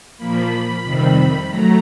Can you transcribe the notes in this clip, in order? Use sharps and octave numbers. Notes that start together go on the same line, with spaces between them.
A#2 F3 A#3 B5
F2 C3 D#3 G3 C4
F#3 A3 A#5